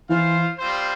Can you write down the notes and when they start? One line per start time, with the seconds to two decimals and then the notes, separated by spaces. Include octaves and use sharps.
0.09 E3 F4 C5 F5
0.58 G3 C4 F4 C5